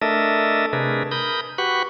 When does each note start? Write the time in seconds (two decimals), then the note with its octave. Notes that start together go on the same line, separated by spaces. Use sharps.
0.02 A3 D4 A4 A#4 D#5 E5
0.73 C3 A3 D4 G#4 A#4 B4
1.11 A#4 B5 D#6 G6
1.58 F#4 G4 B4 F#5 B5 C#6